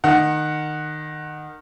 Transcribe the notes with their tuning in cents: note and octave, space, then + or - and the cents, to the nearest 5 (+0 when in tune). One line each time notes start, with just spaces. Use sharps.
D#3 -20 F#5 +0